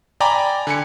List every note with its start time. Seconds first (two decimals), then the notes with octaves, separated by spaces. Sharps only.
0.20 D5 G5 G#5 A#5 B5 D6
0.67 D3 G#5 C#7